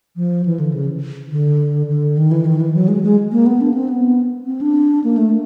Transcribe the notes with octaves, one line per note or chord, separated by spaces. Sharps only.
F3
E3
D3
C#3
D3
D3
D#3
E3
D#3
E3
F#3
G#3
G#3
A#3
B3
D4
C4
B3
C4
D4
A#3
A3